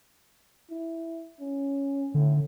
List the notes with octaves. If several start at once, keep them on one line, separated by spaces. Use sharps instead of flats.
E4
C#4
A2 D3